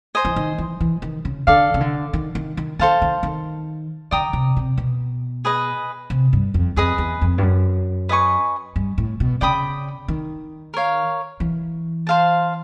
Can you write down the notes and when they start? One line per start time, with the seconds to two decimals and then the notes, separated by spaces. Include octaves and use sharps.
0.15 C5 D#5 G#5
0.25 E3
0.36 D#3
0.58 E3
0.81 E3
1.02 D#3
1.25 C#3
1.47 D3 A4 D5 F5
1.74 C#3
1.81 D3
2.13 D#3
2.35 D#3
2.57 D#3
2.79 D#3 A4 C5 F5 A5
3.02 D#3
3.23 D#3
4.11 D3 D5 G5 A#5 D#6
4.33 C3
4.57 C3
4.77 B2
5.45 G#4 B4 D#5
6.10 C3
6.33 G2
6.54 F2
6.76 F2 G#4 B4 D#5
6.98 E2
7.21 F2
7.38 G2
7.42 F#2
8.09 B4 D#5 G#5 C#6
8.76 G2
8.98 A2
9.20 B2
9.41 C#3 D5 G5 B5 D#6
10.08 D#3
10.74 A#4 C#5 F5
11.40 E3
12.07 C5 F5 A5